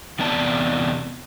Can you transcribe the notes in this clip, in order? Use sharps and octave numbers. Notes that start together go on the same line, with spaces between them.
E2 C3 B3 D5 A5